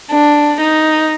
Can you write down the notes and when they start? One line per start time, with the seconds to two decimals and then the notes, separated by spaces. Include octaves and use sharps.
0.11 D4
0.60 D#4